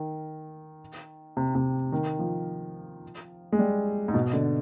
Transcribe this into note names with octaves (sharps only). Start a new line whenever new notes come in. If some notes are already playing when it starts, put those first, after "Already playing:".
Already playing: D#3
C3
C3
D#3
F3
G#3
G3
G#2
B2
D3